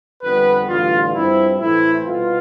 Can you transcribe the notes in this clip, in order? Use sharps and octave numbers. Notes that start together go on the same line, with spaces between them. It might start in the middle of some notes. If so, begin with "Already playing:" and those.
F2 D3 G3 B3 B4
A1 G2 D3 F4
G2 F3 C4 E4
A2 E3 A3 C4 E4
C2 B2 B3 F4